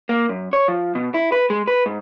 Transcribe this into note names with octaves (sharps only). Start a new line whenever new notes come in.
A#3
F#2
C#5
F3
B2
E4
B4
G#3
B4
G#2